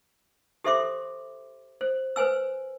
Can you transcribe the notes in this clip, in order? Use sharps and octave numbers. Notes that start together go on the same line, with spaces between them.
G4 A4 C5 E5 C6 D6
C5
B4 C5 G#5 E6